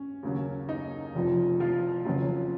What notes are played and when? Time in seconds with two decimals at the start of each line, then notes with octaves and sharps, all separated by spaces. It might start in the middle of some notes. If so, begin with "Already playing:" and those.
Already playing: C#4
0.23 D#2 C#3 F#3
0.69 D#4
1.15 F1 F2 F3
1.60 F3 F4
2.05 F#1 F2 C#3 F#3